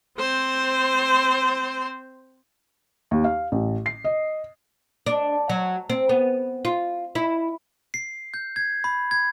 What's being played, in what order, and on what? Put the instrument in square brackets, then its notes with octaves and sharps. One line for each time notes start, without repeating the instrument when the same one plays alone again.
[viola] C4 C5
[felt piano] D#2
F5
A1
C7
D#5
[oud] D4
F#3
C4
B3
F4
E4
[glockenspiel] C7
G6
G#6
B5
G#6